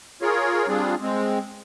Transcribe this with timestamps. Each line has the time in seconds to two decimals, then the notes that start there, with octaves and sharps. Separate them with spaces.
0.22 F4 G#4 A#4 C#5
0.68 G3 C4 D4 F4 G#4
1.02 G#3 C4